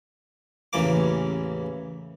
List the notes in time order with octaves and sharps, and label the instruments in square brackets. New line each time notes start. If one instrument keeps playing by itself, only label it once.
[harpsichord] A1 E2 C#3 A#3 D6